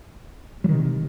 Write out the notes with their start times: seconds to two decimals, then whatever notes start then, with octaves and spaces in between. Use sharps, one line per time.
0.64 F#3
0.69 D#3
0.73 C3